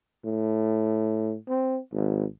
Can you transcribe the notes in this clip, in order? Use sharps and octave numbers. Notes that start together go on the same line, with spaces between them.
A2
C4
G#1